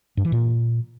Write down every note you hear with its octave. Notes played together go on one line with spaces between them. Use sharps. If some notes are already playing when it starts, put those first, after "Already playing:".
G2
E3
A#2